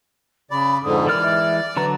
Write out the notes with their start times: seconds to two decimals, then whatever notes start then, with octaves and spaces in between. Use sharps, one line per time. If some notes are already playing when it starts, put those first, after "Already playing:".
0.51 C#3 D5 B5
0.83 F2 G#2 D3 D#6
1.07 E3 G#3 A#4 D5 F6
1.22 E5
1.76 D3 F#3 B4 A#5